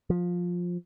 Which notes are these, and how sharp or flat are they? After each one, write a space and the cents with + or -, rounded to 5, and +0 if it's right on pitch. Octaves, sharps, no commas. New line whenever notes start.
F3 +15